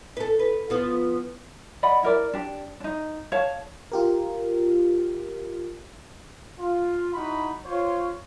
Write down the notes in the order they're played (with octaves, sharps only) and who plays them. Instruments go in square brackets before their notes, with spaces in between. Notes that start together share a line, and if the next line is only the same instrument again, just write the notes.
[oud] A4 B4
B4
F3 B3 F4
[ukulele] D5 D#5 F#5 B5
E4 A#4 D5
D4 G4
D4 D#4
C#5 F5 A5
[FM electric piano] F4 G4 A#4
[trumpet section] F4
D#4 E4 F#4 B5
F4 C5 C#5